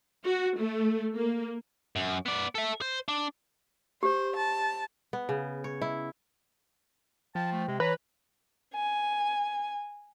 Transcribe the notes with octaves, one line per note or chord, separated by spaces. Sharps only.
F#4
A3
A#3
F#2
B3 D5
A4 E5
C5
D4
G4 C5
A5
B3
C#3
C#5
E4
F3 G5 A5
A3
C3 G#3
E3 B4 C#5 A#5
G#5